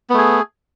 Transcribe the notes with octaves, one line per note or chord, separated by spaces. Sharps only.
A3 B3 G#4